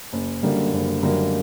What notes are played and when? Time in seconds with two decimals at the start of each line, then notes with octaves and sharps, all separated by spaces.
0.13 F#1
0.43 F#2 D3 G3 A#3
0.73 F#1
1.03 F#2 D3 G3 A#3